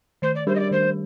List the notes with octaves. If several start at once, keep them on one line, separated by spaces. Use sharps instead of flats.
D#3 C5
D5
G3 D4 G4 A#4 C5
D#5
D5
D#3 C5